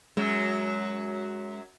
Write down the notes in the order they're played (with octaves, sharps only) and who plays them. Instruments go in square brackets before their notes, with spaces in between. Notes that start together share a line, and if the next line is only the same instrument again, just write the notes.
[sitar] F#2 F#3 [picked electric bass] G#3